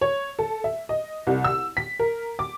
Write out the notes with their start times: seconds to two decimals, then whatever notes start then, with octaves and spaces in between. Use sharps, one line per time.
0.01 C#5
0.39 A4
0.64 E5
0.89 D#5
1.27 C2
1.44 E6
1.77 B6
1.99 A#4
2.39 D6